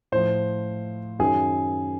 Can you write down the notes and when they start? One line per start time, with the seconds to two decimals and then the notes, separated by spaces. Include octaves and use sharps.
0.12 A2 F3 C5
1.19 F#2 D#3 F#3 G#4